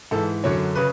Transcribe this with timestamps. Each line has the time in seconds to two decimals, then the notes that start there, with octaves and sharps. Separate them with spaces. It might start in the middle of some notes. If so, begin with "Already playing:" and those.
0.11 G#2 E3 A4
0.44 F#2 D3 F#3 C#5
0.75 C#3 B4